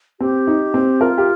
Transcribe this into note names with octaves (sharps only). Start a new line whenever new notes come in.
C4 G4
D#4
C4
F4 A#4
G4